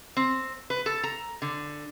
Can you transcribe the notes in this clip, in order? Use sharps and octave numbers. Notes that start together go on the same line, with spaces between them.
C4
B4
A4
A#5
D3